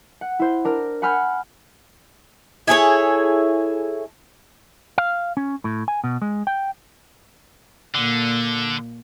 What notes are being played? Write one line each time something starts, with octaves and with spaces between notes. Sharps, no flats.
F#5
E4 C5
D4 A#4 F6
F#5 G#5 B5 F6 G6 C#7
E4 G#4 A4 C#5
F5
C#4
A2
G#5
B2
G#3
G5
A#2 D3